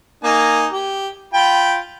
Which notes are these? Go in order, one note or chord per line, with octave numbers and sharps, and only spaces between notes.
A#3 D#4 G#5
G4
F4 G5 B5